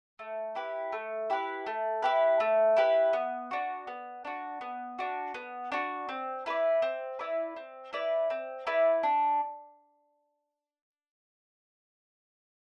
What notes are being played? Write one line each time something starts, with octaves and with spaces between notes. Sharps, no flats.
A3
E4 G4 B4
A3
E4 G4 B4
A3
E4 G4 B4
A3
E4 G4 B4
B3
D4 F#4
B3
D4 F#4
B3
D4 F#4
B3
D4 F#4
C4
E4 B4 D5
C4
E4 B4 D5
C4
E4 B4 D5
C4
E4 B4 D5
D4